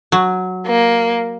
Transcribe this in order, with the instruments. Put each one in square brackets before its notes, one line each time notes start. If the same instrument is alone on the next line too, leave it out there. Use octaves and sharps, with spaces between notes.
[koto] F#3
[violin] A#3